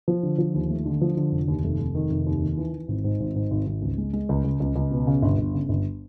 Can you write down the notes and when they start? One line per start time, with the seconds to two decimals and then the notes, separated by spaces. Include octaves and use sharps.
0.08 F3
0.23 D3
0.38 F3
0.54 D#2
0.70 A3
0.86 D3
1.01 F3
1.17 D3
1.32 F1
1.48 D#2
1.64 F1
1.79 F1
1.95 D#3
2.11 F1
2.26 D#2
2.42 D#3
2.57 E3
2.73 E3
2.88 G#1
3.04 G#2
3.20 G#1
3.36 G#2
3.51 G#1
3.67 G#1
3.82 C#2
3.98 G#3
4.13 G#3
4.29 C#2
4.44 C#2
4.60 C#2
4.76 C#2
4.91 B2
5.07 C#3
5.22 G1
5.38 G1
5.54 C#3
5.69 G1